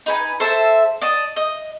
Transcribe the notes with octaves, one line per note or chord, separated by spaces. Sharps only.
D#4 B4 G#5
A4 C5 E5 A5
D5 D#5 A5 D#6
D#5